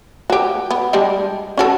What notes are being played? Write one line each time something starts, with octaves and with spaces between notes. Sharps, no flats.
F#4 G4
B3
G3 G#3 D4
C#4 F#4 A4